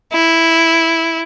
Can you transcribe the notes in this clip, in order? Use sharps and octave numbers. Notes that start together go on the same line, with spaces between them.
E4